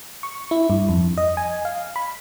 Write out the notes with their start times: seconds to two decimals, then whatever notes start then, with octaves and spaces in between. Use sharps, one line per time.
0.23 C#6
0.51 E4
0.70 G2
0.89 F2
1.18 D#5
1.37 G#5
1.65 F5
1.96 B5